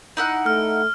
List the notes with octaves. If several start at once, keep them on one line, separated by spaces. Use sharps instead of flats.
D#4 E4 F#5
A3 F6